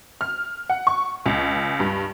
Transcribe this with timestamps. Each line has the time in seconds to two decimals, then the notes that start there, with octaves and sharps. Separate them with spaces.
0.21 F6
0.70 F#5
0.87 C#6
1.26 C#2
1.80 G2